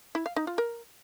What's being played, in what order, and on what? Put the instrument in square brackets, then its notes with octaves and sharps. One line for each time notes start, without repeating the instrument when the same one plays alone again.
[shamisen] E4
F5
D#4
F4
A#4